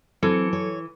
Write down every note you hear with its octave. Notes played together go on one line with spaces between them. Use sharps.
E3 F#3 C4 A4 C#7
C#5